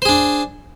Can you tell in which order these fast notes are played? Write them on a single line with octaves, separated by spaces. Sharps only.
C5 G#4 D4